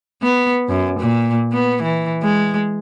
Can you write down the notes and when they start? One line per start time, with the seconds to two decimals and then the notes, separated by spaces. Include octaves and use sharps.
0.22 B3
0.69 F#2
1.00 A#2
1.53 B3
1.83 E3
2.23 G#3